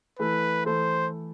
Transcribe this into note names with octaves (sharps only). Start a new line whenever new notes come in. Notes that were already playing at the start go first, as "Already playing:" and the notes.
E3 A3 E4 A4 B4
E3 A3 E4 A4 C5